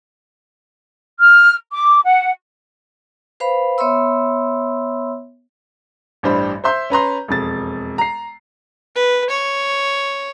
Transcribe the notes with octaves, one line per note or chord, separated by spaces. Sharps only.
F6
D6
F#5
B4 C5 F5 B5
B3 C#5 E5 B5 C6 E6
A1 G2 G3 D4 C5 B5
C5 E5 C6 G6
C#4 B4 A#5 C6
E1 F2 A6
A#5 C7
B4
C#5